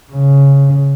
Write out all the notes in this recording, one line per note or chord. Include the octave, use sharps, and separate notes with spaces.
C#3